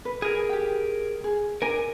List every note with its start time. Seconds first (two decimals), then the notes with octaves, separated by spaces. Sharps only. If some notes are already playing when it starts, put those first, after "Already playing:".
0.05 B4
0.22 G#4 A#4
0.49 G4 G5
1.24 G#4
1.62 D4 A#4 G#5